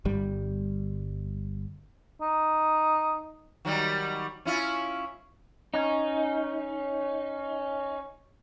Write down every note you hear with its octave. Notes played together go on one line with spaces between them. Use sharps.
G1 G3
D#4
D#3 F#3 G3
C#4 E4 F4
C#4 D#4